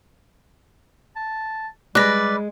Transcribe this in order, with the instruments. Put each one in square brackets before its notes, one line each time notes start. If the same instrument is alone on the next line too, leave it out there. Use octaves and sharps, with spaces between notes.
[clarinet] A5
[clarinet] G3 [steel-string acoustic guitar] G#3 [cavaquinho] B4 D5 [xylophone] F#6 A#6